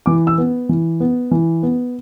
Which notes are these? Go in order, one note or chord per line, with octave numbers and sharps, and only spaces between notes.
E3 D6
E6
B3
E3
B3
E3
B3